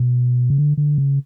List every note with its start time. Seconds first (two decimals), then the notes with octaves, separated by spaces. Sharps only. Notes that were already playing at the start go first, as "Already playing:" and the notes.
Already playing: B2
0.50 C#3
0.58 D3
0.78 D3
0.98 C#3